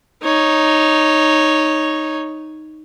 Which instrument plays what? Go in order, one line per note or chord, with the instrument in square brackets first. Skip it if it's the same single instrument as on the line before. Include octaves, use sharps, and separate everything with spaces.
[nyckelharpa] D#4 C#5